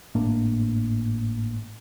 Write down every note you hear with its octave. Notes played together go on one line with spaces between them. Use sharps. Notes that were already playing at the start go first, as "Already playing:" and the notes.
G#1 A2 A#3 D4